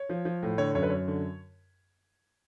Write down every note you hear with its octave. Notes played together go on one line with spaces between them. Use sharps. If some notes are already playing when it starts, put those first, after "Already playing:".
Already playing: C#5
F3
F3
A2
D3 C#5
F#2 C#5
B4
F#2 C#5
D3